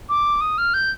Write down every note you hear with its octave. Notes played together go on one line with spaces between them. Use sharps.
D6
D#6
F6
G6